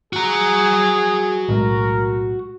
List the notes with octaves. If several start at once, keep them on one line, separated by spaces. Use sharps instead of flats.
F#4 G#4 A#5
B1 A2 G#3 A#4